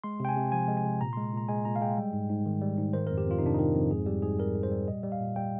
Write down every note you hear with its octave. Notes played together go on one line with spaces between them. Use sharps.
G#3 C6
C3 G5
G#5
C3
F3 G#5
G#3
G#5
C3
A#2 A#5
G#3 C6
A#2 A#5
G#3 G#5
A#2 A#5
F5
G#3 G5
G3
G#2
G#2
D#3
G3
G#2
D#3 C5
F2 A#4
G4
F2 F4
D#4
C3 D4
D#3 D#4
F2
G#2 G#4
G3 G4
G#2 G#4
G3 A#4
G#2
C5
G3
A#2 D#5
G3
F5
A#2
G3 G5